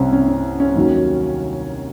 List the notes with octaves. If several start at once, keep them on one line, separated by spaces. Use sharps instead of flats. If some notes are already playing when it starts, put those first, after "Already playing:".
Already playing: C2 C3 C4 C#4
C#4
C#4
C#4
D#2 D#3 F#3